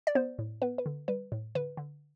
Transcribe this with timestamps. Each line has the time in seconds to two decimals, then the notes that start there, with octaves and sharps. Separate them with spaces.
0.07 D5
0.15 B3 C5
0.39 A2
0.62 B3 B4
0.78 B4
0.86 D3
1.08 G3 B4
1.32 A2
1.55 D3 B4
1.77 D3